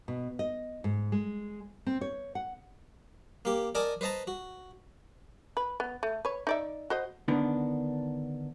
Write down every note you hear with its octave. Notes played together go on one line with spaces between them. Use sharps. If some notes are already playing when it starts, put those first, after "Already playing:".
B2
D#5
G#2
G#3
C4
C#5
F#5
A#3 G4
A#4 D5 D#5 G#5 A5
B4 C5 D#5 A5 A#5
F#4
B4
B3
A3
B4 C#5
D#4 D5 E5
F#4 C5 D#5
D3 D#3 B3 D4